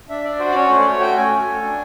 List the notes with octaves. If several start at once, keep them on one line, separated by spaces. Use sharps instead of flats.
D4 E5
D4 D5
F#4 C5
D5
C#4 C#5
A3 C5
D5
A3 C#5
F#4 G5
C#4 G#5
A3
A4
D4